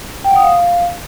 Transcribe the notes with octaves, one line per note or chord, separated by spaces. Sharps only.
G5
F#5
D#6
F5